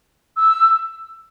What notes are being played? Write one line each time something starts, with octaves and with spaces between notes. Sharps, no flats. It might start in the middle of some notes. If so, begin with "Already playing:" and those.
E6